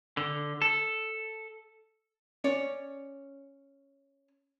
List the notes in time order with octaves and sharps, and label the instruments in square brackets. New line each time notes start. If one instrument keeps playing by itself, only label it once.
[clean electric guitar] D3
A4
[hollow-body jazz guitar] C#4 C#5 D5